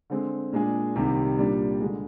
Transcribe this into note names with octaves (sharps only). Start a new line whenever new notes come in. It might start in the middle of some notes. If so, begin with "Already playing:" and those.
D3 G#3 C4
A#2 G#3 D4 G#4
C2 C3 D#3 G3
A#2 G3 D4
D3 G#3